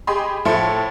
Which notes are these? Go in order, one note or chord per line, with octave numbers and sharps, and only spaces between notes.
G4 G#4 D#5 B5 C6
A2 F3 E4 A4 C6 C#7